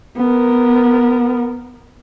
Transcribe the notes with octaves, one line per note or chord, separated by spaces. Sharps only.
B3 A#4